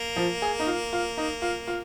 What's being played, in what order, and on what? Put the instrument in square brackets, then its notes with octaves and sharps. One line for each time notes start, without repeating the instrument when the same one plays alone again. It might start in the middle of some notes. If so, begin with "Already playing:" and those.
Already playing: [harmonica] A#3
[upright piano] F3
G#4
D#4
F4
F4
D#4
F4
F4